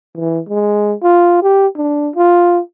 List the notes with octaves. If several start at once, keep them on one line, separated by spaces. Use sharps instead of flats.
E3
G#3
F4
G4
D4
F4